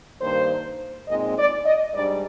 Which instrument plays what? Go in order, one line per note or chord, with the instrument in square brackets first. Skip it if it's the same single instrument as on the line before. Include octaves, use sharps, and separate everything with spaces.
[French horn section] G2 D#3 A#3 C5
A#2 G#3 C4 D#4 D#5
D5
D#5
G#2 G3 D4 D5